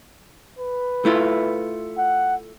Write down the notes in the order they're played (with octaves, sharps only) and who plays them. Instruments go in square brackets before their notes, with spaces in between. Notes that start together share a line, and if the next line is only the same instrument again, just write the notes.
[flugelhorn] B4
[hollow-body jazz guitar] A3 E4 F4
[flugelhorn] F#5